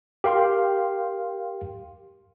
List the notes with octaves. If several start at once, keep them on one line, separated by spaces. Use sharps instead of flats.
G4 A#4 F5 G5 C6